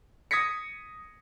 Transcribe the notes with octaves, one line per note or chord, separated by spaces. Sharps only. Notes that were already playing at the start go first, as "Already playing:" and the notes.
D#6 G#6 A#6 B6 C#7